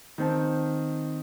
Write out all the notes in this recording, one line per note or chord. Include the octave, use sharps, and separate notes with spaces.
D#3 C4 A5